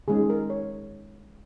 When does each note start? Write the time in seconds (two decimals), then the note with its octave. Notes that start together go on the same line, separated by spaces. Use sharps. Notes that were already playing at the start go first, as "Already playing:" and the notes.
0.08 D#3 G#3 C#4 G#4
0.30 A#4
0.50 C#5